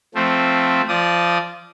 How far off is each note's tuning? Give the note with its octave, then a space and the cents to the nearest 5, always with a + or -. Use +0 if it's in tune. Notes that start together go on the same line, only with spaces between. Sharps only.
F3 +0 A3 +0 C4 +0
F3 -15 D5 +0 D#6 +10